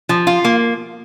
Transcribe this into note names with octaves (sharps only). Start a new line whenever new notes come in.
F3
F4
A#3